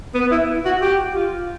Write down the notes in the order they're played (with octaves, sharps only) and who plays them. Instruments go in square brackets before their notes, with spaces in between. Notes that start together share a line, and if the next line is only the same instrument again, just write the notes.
[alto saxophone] B3
E4
F#4
G4
F4